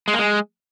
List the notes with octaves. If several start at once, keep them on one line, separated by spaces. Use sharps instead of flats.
G#3
A#3
G#3